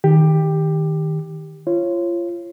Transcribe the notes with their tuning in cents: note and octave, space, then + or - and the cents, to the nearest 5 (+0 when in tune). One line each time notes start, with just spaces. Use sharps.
D#3 +5 G4 +10
F4 -30 C#5 -25